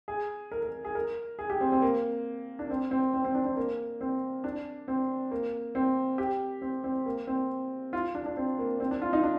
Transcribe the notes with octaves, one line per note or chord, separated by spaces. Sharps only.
G#4
A#4
A#4
G#4
A#4
G#4
G4
C4
C4
A#3
D4
C4
C4
C4
C4
D4
C4
A#3
C4
D4
C4
A#3
C4
G4
C4
C4
A#3
C4
F4
D4
D4
C4
A#3
C4
D4
F4
D#4
D4